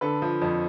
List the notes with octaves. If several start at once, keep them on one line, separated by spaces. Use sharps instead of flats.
D3 A4 B4
F3
F2